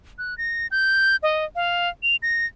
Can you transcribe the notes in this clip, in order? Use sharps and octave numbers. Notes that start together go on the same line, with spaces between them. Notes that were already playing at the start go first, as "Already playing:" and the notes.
F#6
A#6
G6
D#5
F5
F7
A#6